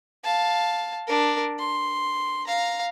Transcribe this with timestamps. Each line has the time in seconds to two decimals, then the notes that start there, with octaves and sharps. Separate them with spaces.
0.24 F5 A5
1.07 D4 A#4
1.59 C6
2.47 F5 A#5